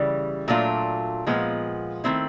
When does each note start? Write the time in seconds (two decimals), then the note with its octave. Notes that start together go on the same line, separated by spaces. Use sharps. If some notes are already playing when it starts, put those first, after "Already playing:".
Already playing: C#3 E3 G3
0.48 A#2 F#3 A3 D4 F4
1.27 A#2 F3 G#3 B3
2.04 D#3 F#3 A3 C4 E4